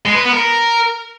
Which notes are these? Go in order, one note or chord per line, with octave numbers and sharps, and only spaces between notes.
G#3
B4
B3
A#4